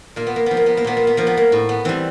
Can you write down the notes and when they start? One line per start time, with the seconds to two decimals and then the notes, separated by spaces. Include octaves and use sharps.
0.16 A#2 A#3
0.27 B3
0.36 A#3
0.46 F3 B3
0.57 A#3
0.66 B3
0.77 A#3
0.84 A#2 B3
0.97 A#3
1.07 B3
1.17 F3 A#3
1.27 B3
1.37 A#3
1.52 A2
1.69 B3
1.85 E3 G3 C4